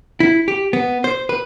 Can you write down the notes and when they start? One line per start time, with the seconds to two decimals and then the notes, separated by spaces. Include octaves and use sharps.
0.20 E4
0.48 G4
0.73 B3
1.04 C5
1.29 B4